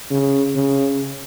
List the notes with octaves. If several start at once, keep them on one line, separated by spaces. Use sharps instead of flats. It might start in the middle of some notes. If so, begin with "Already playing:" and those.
C#3
C#3